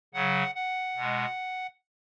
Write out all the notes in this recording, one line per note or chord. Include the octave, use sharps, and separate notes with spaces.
C#3 F#3 F#5
F#5
B2 G#3